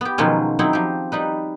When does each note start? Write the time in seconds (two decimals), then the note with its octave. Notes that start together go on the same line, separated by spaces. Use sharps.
0.01 B3 G4
0.18 B2 D#3 F3 F#3 G#3 C#4
0.59 F#3 C4 D#4 E4
0.73 F3 G4
1.12 G3 D#4 B4